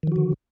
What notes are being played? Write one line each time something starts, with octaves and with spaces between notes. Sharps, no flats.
D3 D#3 F3 F#4